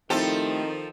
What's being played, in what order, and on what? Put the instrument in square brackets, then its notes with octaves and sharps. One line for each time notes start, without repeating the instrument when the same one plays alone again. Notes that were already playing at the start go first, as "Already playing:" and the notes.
[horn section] D#3 [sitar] F3 A4 [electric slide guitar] A3 G4 [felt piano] C4 D#4 E4